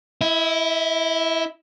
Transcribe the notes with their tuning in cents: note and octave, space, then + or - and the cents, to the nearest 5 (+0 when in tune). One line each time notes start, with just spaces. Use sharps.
E4 +0 D#5 +45